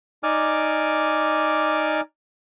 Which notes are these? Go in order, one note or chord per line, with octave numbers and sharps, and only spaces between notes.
D#4 D5 G#5 D6 F6